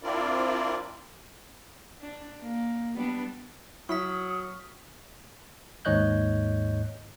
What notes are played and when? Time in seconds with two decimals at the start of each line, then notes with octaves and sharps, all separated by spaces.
0.03 C4 D4 E4 F4 A#4 D5
2.01 D4
2.42 A#3
2.96 G3 B3 D4
3.89 F#3 E4 C#6 D#6 F6 B6
5.85 D#2 G#2 C#5 D#5 F#6 G6